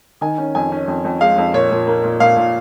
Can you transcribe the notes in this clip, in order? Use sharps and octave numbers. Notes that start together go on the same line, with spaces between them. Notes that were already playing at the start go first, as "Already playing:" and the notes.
D#3 G#5
C#4
F2 G#5
C#4
F2
F2
G#3 F5
F2
A#2 C#5
A#2
A#3
A#2
A#2 F5
A#2